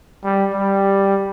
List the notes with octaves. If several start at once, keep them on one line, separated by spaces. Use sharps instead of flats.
G3
G3